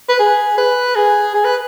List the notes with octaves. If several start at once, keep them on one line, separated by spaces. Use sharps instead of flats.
B4
G#4
B4
G#4
G#4
B4